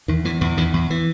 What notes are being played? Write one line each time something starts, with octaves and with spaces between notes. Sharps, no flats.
E2 D#3
E2 E3
E2 E3
E2 D#3
E2
E3